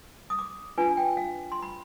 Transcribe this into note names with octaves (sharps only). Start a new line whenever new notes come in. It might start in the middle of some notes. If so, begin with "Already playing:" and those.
D#6
D6
D4 F4 B4 G#5
G5
F5
C6
B5